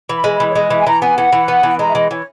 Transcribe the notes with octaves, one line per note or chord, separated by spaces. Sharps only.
E3 B5
G#3
B5
E3
C#5
G#3 D#5
E3 E5
G#5
E3 A#5
B3 G#5
E3 F#5
E3
B3
E3
G#3 A#5
E5
E3 D#5
E3 C#5